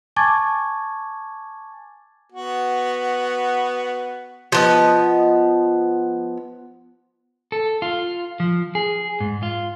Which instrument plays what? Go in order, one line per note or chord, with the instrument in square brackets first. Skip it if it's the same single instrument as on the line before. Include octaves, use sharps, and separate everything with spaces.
[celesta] G#5 A5 C#6 D6 G#6 A6
[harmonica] B3 F#4
[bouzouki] F3 B3 D#5
[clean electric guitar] A4
F4
F3
G#4
G#2
F4